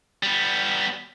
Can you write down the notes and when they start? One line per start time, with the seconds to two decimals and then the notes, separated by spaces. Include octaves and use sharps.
0.23 G3 B3